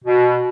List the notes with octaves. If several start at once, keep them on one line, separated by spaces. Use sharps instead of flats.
B2